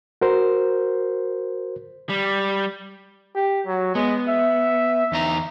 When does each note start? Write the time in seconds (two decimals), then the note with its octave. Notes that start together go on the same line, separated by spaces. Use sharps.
0.21 F#4 A#4 C5
2.09 G3
3.35 G4
3.66 F#3
3.95 G#3 B3
4.28 E5
5.12 E2 D#4 A#5